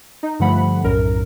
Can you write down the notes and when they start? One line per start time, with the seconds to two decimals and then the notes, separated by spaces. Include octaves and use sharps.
0.23 D#4
0.39 G2 D3 F3 A3 F#5 B5
0.84 B1 F#2 A2 A#4